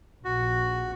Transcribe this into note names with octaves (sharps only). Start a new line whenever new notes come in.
A#1 F#4